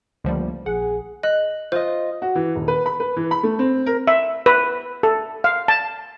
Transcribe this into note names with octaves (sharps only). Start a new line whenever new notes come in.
C#2 D3 F3 G3 A3 A#3
A#1 G#4 F#5
D#5 F#6
F4 C5 D#5
F#4
E3
D#1
B4
B5
B4
E3
B5
A3
C4
A#4
E5
B4
A4
F5
A5